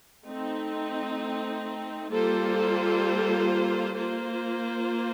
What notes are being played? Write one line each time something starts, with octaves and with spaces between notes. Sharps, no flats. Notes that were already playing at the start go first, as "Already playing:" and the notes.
A3 C4 D#4
G3 A#3 F4 A4 C5
A#3 F4 C5